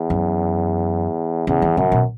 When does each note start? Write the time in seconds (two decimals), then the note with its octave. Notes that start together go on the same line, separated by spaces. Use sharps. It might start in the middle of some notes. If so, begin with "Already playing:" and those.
Already playing: E2
0.10 F#2
1.47 E2 C#3
1.62 E3
1.77 F#2 C#3
1.92 B2